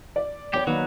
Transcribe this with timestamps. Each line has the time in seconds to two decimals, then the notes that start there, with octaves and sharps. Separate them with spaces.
0.16 D5
0.53 B3 G4 C#5 G5
0.67 D#3 F#3 A#3 D#4 B4